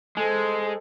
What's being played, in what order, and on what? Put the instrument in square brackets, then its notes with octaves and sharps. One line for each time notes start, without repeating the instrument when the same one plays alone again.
[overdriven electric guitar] G#3 [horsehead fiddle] A4 C5